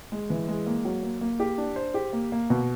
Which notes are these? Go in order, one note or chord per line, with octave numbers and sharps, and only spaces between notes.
G#3
E3
G#3
A#3
F#3
A#3
A#3
G4
D4
C5
G4
A#3
A#3
B2